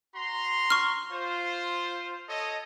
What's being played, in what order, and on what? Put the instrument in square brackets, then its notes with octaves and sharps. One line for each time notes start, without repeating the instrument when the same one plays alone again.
[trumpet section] F#4 A#5 C6
[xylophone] C#6 F6
[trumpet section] F4 C5
A4 C#5 D#5